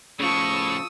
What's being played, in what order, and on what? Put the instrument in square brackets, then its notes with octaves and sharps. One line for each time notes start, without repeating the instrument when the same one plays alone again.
[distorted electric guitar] A2 [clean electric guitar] C#3 F3 [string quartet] A5 C#6 [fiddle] D#6 E6